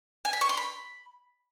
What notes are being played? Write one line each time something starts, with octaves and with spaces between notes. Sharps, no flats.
G#5
B5
C#6
C6
B5